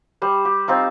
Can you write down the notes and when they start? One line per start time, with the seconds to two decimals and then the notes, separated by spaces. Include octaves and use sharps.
0.22 G3 C5
0.45 G4
0.68 C4 D#4 F4